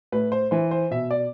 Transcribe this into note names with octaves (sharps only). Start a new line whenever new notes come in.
A2 B4
C5
E3 C5
C5
B2 E5
D5